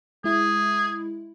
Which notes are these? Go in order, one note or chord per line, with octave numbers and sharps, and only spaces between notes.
G#3 E4 G#4